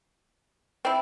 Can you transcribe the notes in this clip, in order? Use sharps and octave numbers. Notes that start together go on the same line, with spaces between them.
C4 E4